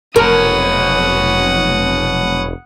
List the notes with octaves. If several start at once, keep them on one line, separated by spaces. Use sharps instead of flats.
F1 B2 F#3 A#4 F#5 D#6